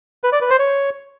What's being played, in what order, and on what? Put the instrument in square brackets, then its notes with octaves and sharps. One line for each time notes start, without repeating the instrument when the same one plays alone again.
[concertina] B4
D5
B4
C5
C#5